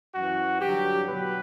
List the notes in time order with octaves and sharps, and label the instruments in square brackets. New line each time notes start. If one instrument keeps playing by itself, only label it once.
[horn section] F#2 E3 F#4
G2 D3 F#3 G4
B2 F#3 B4